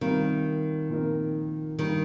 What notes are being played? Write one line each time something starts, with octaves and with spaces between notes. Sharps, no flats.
C3 D#3 G3 C4 F4 A#4
A#2 F3 C4 D#4 A#4
G2 D3 D#3 G3 A#3